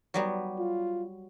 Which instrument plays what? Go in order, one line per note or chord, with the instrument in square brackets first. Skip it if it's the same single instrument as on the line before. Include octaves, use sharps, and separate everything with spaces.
[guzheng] F#3 G3 B3
[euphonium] F4